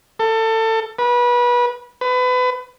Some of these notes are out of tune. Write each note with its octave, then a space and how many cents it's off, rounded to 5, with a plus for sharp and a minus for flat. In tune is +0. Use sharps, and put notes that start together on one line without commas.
A4 +25
B4 -25
B4 +30